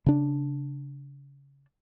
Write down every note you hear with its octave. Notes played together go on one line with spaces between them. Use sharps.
C#3 D4